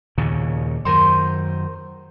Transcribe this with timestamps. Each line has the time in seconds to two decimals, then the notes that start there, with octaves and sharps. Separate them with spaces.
0.18 D#2 A#2 C#3
0.85 F#2 D#3 A#4 C5 C6